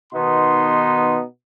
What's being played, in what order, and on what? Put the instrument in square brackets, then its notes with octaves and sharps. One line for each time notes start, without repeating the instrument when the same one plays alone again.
[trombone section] B2 B3 D#4 [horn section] D#3 C6